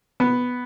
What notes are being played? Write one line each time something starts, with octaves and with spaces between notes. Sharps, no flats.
B3